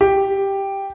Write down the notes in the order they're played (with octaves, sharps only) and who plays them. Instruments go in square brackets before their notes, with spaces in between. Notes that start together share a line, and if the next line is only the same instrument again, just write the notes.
[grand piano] G4